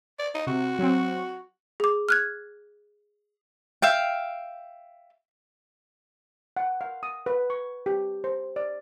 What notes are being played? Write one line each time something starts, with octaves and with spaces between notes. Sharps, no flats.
D5
D#4
C3 F#4
F#3 C4
G#4 D6
F6 F#6 G#6
E5 F5 G5
F#5
F5
D#6
B4
C#6
G4
C5
D5